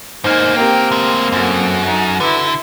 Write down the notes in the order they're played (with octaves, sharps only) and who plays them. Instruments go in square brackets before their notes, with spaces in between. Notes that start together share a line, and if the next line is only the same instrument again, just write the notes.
[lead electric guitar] G#2 A#3 [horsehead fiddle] D#4 G#5 [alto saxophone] C5
[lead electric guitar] E3 G5 [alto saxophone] A#3 [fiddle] C4 [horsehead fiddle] G4 A#4
[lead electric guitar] D2 G#3
[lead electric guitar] F#2 [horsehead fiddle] F#4 A4
[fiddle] D#4
[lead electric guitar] D3 [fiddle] E4 [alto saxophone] B4